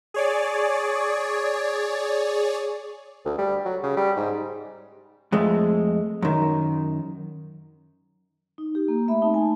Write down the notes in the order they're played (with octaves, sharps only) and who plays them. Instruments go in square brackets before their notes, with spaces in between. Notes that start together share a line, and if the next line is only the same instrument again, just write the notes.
[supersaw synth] G#4 C#5 D5
[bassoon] D2
G3
F#3
C#3
G3
G#2
[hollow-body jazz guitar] F2 G#3 A3
F#2 D#3
[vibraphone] D#4
G4
A#3
A3 E5 B5
C4 D#4 A5
G#5